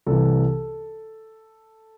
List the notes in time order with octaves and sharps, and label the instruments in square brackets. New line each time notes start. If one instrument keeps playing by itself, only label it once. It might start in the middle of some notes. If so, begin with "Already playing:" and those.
[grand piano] C2 C3 E3 A4